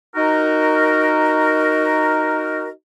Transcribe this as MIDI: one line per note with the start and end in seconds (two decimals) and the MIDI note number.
0.15 2.69 63
0.15 2.69 66
0.15 2.69 70